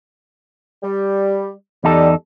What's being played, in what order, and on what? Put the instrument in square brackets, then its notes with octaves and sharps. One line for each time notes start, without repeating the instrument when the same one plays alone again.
[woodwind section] G3
[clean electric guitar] E2 D#4 A4 [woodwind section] G3